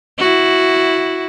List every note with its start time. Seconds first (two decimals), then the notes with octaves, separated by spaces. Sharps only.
0.18 E4 F#4